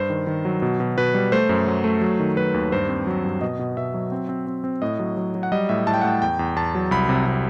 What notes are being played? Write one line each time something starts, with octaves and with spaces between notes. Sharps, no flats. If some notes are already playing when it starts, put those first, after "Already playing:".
Already playing: G2 C5
D#3
D#3
F#3
B2
B2
B2 B4
G3
A3 C5
F#2
F#3
A3
F#3
D#3
F#3 B4
D#2
G2 C5
C4
F#3
G2
B2 D#5
B2
B2 E5
F#3
C4
C4
C4
C4
A2 D#5
F#3
F#3
F#3
F#5
G3 D#5
A2 E5
A2 A5
G5
F#5
A2 G5
E2 G5
E2
E2 A5
F#3
C2 B5
C3
C3